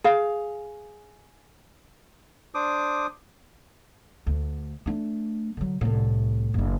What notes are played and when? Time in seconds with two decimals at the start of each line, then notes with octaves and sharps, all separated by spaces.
0.04 G#4 F5
2.54 D4 C5 D6 D#6
4.27 D2
4.86 A3 D4
5.57 D3 F#3
5.81 C2 A2
6.54 F#1 D4